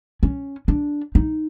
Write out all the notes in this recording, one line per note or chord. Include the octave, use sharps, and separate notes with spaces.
C#4
D4
D#4